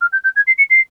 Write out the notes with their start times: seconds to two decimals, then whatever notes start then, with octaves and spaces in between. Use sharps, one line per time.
0.01 F6
0.12 G6
0.24 G6
0.36 G#6
0.47 C7
0.58 C#7
0.70 C7